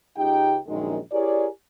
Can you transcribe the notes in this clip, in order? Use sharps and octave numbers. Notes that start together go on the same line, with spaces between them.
C#2 D#4 G4 G5
A#1 F#2 D#3 G#3
E4 G4 G#4 A#4 C#5 D5